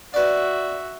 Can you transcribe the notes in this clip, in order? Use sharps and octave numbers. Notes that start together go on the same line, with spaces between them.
F#4 B4 D5 E5